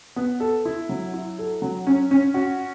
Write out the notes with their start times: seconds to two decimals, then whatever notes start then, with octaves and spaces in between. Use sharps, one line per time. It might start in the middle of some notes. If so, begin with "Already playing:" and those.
0.16 B3
0.40 A4
0.65 E4
0.89 F#3
1.14 E4
1.38 A4
1.62 F#3
1.87 C#4
2.11 C#4
2.34 F#4